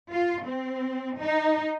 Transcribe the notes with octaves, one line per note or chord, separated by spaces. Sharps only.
F4
C4
D#4